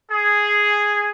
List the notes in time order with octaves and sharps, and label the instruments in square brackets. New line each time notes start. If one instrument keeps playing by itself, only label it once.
[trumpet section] G#4